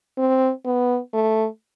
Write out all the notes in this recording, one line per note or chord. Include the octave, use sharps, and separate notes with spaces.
C4
B3
A3